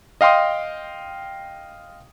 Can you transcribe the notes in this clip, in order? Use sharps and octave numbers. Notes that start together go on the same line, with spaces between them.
D#5 F5 G5 C6 D#6